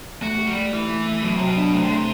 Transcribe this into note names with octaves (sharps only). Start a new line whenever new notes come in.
A3 F#4
G4
G3
A3
E3 A3
A3
A3
B2 F#3
C3
F#3
B2
D4
C3 A3
D3
C3 A3